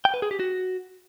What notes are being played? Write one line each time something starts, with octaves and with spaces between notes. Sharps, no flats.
G5
B4
G#4
G4
F#4